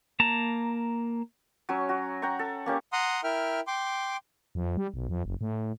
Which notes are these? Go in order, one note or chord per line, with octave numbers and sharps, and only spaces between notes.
A#3 A5 A#5
F#3 C#4 C#5
F#4
F#5 G5 A#5 C#6
A4
A#3 C#4 G4
F#5 A#5 C6 D#6
E4 A#4 E5 G5 F6
G5 C6 D6
F2
G3
B1
F2
F#1
A2